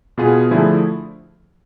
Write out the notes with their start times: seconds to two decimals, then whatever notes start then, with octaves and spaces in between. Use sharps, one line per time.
0.18 B2 B3 F4 G#4
0.51 D3 F3 A3 E4 G#4